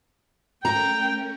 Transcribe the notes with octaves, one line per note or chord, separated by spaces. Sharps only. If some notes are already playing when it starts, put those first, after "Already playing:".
A3 C#4 A#4 G5 A#5